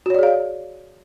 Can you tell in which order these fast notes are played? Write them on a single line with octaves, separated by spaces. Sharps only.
F#4 C#5 D5 G#4 F5